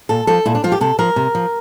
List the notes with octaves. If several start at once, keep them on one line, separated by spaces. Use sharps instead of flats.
A#2 A4
F3 A4
A#2 E4
D4
F3 F4
G4
C3 A4
F3 A#4
C3
F3